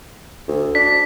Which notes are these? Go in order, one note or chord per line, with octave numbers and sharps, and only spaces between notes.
D2
D4 B6